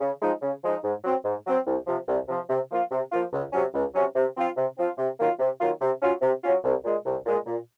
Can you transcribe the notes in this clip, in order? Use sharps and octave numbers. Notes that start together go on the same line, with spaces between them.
C#3
F3 G#3 D#4
C#3
F3 G#3 D#4
G#2
F#3 C4
G#2
F#3 C4
C2
C3 F3
C2
C3 F3
C3
F3 A#3 F4
C3
F3 A#3 F4
C#2
C3 F#3 C#4
C#2
C3 F#3 C#4
C3
F3 C4 F4
C3
F3 C4 F4
C3
D#3 F#3 A#3 F4
C3
D#3 F#3 A#3 F4
C3
F#3 C#4 F4
C3
F#3 C#4 F4
C2
A#2 G#3
C2
A#2 G#3
A#2